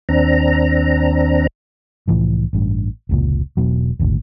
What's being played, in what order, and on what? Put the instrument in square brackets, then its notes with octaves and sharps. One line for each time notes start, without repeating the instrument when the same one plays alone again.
[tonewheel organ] D#2 C4 D4 A#5
[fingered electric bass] C2 A2 E3 F3
A1 G2
F1 C#2 A#2
E1 B2 F#3
D#1 G#1 D2